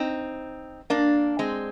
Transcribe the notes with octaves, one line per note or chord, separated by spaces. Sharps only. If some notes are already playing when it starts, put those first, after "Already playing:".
Already playing: C4 D#4
A#3 D4
G#3 C4